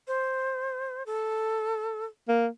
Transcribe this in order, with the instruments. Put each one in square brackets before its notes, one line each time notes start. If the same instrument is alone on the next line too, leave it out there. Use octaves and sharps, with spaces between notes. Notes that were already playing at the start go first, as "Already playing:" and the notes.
[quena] C5
A4
[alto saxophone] A#3